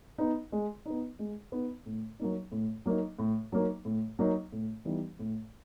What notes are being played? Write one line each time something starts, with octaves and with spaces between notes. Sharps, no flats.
B3 D#4
G#3
B3 D#4
G#3
B3 D#4
A2
F#3 A#3 D#4
A2
F#3 A#3 D#4
A2
F#3 A#3 D#4
A2
F#3 A#3 D#4
A2
E3 G3 B3 D#4
A2